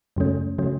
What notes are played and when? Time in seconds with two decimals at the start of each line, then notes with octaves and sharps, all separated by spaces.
0.16 F#2 C#3 F#3 A3 C#4
0.58 C#3 F#3 A3 C#4